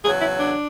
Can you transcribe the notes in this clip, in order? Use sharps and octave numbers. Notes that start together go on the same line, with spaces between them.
E2 C#3 F#3 G#4
E4
D4